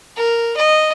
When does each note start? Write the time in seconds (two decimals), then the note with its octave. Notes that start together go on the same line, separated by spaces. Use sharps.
0.16 A#4
0.57 D#5